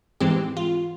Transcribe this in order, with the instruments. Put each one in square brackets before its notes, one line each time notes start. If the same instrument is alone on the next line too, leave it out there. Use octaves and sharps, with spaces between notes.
[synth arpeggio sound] G#2 E3 G#3 C4 G4
F4